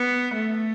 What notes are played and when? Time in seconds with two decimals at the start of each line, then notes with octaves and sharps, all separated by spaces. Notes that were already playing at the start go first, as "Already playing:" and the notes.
Already playing: B3
0.34 A3